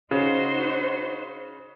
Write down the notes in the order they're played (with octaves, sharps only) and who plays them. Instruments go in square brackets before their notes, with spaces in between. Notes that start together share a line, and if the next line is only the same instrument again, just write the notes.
[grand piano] C#3 [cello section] D#4 F#4 C5